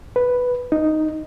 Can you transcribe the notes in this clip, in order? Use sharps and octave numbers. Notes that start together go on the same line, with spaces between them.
B4
D#4